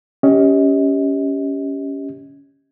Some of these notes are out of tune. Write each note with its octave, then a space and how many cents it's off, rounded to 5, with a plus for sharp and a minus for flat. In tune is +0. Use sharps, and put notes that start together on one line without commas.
C#4 +10 G4 +0 D#5 +30